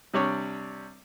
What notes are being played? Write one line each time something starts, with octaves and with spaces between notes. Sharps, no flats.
C3 G3 D4 C#5